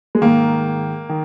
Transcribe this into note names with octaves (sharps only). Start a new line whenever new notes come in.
G#3
G#2 D#3 A#3
D#3